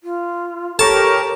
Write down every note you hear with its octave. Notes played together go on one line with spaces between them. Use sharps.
F4
G4 A4 A#4 C#5 A5 A#5 C#6